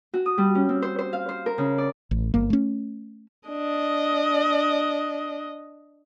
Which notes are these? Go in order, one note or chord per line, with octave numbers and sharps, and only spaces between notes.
F#4
D#6
G3
C#4
C4
C5
C5
F5
C5
A#4
C#3
D5
A1
G1 A#3
A3 C#4
D4 D#5